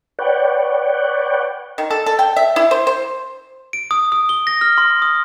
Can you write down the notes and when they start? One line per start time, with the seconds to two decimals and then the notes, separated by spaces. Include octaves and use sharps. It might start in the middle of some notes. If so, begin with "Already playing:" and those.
0.19 B4 C#5 D5 F#5 G5
1.78 D#3
1.91 A4
2.06 A4
2.19 G5
2.36 E5
2.56 E4
2.71 C5
2.87 C5
3.73 D7
3.91 D#6
4.12 D#6
4.29 G7
4.47 A#6
4.61 F6
4.78 C6
5.02 D#6